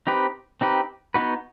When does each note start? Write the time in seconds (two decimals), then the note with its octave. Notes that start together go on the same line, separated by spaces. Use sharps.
0.07 C4 D#4 G4 B4
0.61 C4 D#4 G4 B4
1.14 B3 D#4 F#4 B4